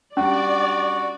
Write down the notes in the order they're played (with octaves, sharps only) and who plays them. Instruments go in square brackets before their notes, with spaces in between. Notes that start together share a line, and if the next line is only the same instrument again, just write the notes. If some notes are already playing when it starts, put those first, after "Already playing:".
[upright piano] G3 D4 [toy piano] C#4 [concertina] F#4 [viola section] D5